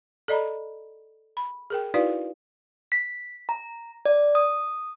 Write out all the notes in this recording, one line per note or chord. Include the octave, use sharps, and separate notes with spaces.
A4 D5 D#5 A#5 B5
B5
G#4 A#4 G5
D#4 E4 F#4 B4 D5 F5
B6
A#5
D5
D#6